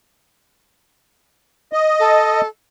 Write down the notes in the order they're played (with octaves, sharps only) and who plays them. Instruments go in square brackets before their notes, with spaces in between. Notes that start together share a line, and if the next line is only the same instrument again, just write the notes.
[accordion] D#5
[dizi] A4